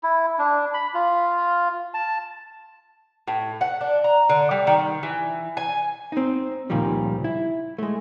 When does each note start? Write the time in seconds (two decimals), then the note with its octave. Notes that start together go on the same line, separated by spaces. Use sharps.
0.03 E4
0.39 D4
0.74 B5
0.94 F4
1.94 A5
3.28 A2
3.61 F#5
3.81 D4
4.04 A#5
4.29 D3
4.51 G3
4.67 D#3
5.03 E3
5.57 G#5
6.12 C4 D#4
6.70 C#2 A#2 D#3 F3 G3
7.24 E4
7.78 G#3 A3